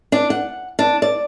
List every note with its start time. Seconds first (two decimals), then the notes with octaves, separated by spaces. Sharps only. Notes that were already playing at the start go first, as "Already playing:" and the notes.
0.12 D4
0.30 F#5
0.79 D4
1.02 D5